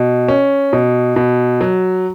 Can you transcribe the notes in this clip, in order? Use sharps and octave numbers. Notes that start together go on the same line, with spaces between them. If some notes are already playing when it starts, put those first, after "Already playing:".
Already playing: B2
C#4
B2
B2
F#3